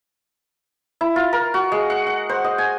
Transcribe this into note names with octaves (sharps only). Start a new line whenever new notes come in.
E4
F4
A#4
F#4
G#3
F#5
F#5
C5
D#5
G#5